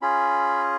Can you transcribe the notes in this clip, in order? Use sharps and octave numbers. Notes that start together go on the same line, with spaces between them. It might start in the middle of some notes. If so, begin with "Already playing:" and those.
C#4 F4 G#4 B5